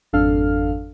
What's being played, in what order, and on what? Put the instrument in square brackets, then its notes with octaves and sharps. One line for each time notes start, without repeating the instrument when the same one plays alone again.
[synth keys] G#1 F2 D4 A4 F5 F6